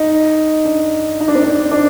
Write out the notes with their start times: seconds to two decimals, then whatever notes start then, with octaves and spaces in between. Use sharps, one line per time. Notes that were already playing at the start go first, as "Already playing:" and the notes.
Already playing: D#4
0.65 D4
1.21 D#4
1.28 D4
1.35 C4
1.43 D4
1.71 D4